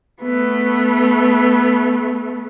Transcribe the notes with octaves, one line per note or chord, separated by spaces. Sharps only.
A3 B3